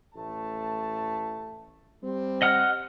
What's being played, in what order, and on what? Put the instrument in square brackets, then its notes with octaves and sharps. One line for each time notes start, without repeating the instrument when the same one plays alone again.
[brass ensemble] A1 A3 A5
G3 C4
[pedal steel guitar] D#5 F#5 F6